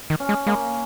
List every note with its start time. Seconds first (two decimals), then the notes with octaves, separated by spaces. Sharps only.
0.10 D#3
0.20 C#4
0.29 G#3
0.47 G#3 A#3